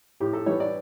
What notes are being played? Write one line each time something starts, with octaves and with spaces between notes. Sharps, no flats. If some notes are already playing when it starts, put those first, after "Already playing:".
A2 G4
A4
E3 G3 B3 C#5
D5